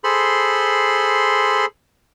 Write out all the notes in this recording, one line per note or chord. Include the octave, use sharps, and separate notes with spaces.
G#4 A4 C5 B5 C6